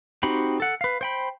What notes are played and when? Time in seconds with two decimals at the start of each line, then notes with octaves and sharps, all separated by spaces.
0.23 C4 D#4 F#4 G4 B5
0.60 A4 F#5
0.81 B4 F5
1.01 C5 G5 B5